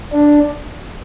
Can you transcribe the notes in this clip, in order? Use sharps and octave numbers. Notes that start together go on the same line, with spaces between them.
D4